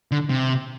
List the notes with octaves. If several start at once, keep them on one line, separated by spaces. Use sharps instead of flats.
D3
C3